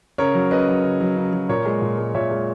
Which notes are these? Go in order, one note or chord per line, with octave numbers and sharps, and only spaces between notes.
C#3 A#4 C#5
F#3
C#3 B4 D#5
F#3
C#3
F#3
C#3
F#3
A#2 A#4 C#5
G#3
A#2
G#3
A#2 C#5 E5
G#3